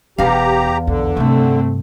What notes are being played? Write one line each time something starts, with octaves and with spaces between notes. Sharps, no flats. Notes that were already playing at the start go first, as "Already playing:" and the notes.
E1 E2 D4 G4 F5 A#5
B1 F2 D3
G2 C3 A3 C4